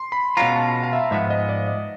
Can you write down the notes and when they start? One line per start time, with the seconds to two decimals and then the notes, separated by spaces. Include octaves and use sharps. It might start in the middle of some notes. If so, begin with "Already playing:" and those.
Already playing: C6
0.12 B5
0.37 B2 G#3 C#4 F4 A#5
0.56 A5
0.83 F5
0.93 E5
1.11 G#2 F3 G#3 B3 E5
1.30 D#5
1.49 D5
1.68 D#5